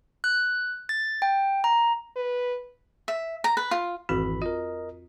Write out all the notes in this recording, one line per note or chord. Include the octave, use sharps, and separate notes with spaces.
F#6
A6
G5
A#5
B4
E5
A#5
B4
F4
G#1 F2 E3 C4 F#4 B5
F4 A#4 D#5